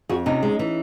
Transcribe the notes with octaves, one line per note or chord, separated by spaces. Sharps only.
F2 F#4 G#4
C3 C#4 D#4
G#3
E3